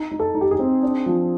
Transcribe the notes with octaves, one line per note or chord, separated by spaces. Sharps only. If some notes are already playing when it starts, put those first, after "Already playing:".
Already playing: D#4
D#4
A4
D#4
G4
G#4
C4
D4
F3